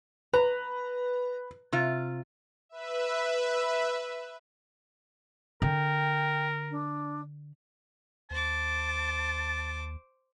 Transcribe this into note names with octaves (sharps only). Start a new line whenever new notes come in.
B4 A#5
C3 F4
B4 E5
D3 A#4 G5
D4
D#2 C5 A5 D6